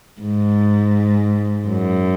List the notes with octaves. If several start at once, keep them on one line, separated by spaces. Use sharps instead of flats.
G#2
F#2